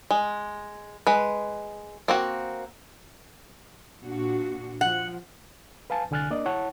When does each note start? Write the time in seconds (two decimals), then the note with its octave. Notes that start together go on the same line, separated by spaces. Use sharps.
0.11 G#3
1.07 G#3 B4
2.08 A#3 C4 F#4
4.02 A#2 D4 F#4
4.81 F3 F#5
5.90 B4 F5 G#5 A5
6.11 C2 D3 G#5 F6 F#6 A6
6.30 A#3 D4 D5 D#5
6.45 E4 C#5 F#5 A5